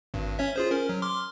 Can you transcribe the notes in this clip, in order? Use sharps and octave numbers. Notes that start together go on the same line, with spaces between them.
G#1 G2
C#4 C#5 E5
F4 G#4 C5
C#4 A#4
F#3
C6 D6 F6